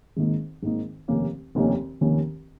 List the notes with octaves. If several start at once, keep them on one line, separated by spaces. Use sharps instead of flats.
G#1 G#2 D#3 A#3 D#4
G#1 G#2 D#3 A#3 D#4
F1 D#2 D#3 A#3 C#4
F1 D#2 D#3 A#3 C#4
F1 D#2 D#3 A#3 C#4